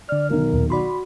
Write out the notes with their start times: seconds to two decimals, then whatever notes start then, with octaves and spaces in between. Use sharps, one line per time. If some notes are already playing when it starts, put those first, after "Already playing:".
0.09 D3 D5 F6
0.30 B1 D#3 A#4
0.53 D#2 A#2
0.70 F#4 D5 B5 C6